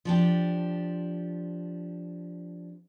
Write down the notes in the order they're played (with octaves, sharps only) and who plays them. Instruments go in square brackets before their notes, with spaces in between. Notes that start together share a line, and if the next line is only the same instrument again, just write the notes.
[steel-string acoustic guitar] F3 D4 G4